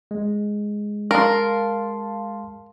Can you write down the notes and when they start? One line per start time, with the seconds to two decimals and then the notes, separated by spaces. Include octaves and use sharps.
0.11 G#3
1.11 A#4 F5 A5 C6